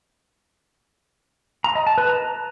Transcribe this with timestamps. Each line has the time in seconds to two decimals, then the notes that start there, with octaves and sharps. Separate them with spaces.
1.64 A#5
1.75 D#5
1.87 A5
1.98 B4
2.09 A#5